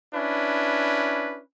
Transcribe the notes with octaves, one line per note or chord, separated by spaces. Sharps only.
C#4 D4 E4 B4